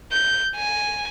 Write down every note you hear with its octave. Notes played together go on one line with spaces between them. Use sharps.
G6
G#5